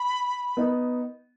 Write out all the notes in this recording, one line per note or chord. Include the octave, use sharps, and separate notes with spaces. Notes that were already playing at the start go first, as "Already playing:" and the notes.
Already playing: B5
B3 D#4